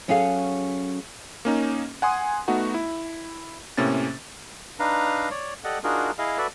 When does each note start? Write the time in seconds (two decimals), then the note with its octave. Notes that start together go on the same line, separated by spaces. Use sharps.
0.08 F#3 C#4 G#4 A4 F5
1.45 A#3 C#4 D#4
2.02 F#5 G#5 C6 D#6
2.48 A3 B3 D#4 F#4 F#5
2.74 E4
3.77 A2 C3 A#3 C#4 A6
4.80 D4 D#4 B4 F5 A#5
5.31 C#5 D5
5.64 G4 A4 D5 D#5 F#5
5.84 D4 D#4 F4 F#4 G#4 A#4
6.18 E4 G#4 D#5 F5
6.38 F#4 A4 B4 D5 E5